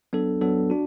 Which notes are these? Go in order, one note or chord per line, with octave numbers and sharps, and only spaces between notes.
F#3 B3 D4 A4
F#3 B3 D4 A4
D4 F#4